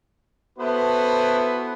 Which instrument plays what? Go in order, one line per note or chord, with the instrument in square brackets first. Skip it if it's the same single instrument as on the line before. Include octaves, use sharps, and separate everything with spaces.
[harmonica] B3 E4 C5 [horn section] F#4 A4 B4